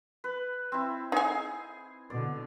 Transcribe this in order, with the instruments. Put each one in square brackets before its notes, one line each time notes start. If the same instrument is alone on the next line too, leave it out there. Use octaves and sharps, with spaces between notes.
[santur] B4
C4 E4
[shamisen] D#4 G#5 [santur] G#4
[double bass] B2 D3 [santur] D5